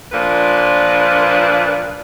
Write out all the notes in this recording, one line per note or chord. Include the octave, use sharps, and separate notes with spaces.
A#2 F3 A#3 D4 B4